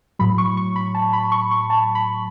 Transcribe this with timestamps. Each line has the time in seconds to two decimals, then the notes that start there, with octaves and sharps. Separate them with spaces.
0.19 A2 F#3 B5
0.38 C#6
0.57 C#6
0.76 B5
0.95 A5
1.13 B5
1.32 C#6
1.51 C#6
1.70 A5
1.95 B5